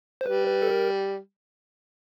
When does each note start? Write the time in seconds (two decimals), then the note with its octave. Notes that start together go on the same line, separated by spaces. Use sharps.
0.21 C5
0.26 G3 B4
0.47 B4
0.62 A4
0.70 A#4